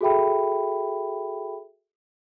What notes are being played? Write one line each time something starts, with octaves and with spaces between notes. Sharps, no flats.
F#4 G#4 A4 E5 G5 B5